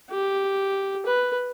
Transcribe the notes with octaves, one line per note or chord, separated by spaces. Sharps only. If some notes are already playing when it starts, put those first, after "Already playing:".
G4
B4